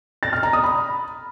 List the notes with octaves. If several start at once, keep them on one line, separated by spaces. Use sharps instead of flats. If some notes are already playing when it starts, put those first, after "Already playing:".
A6
F6
A#5
D#6
B5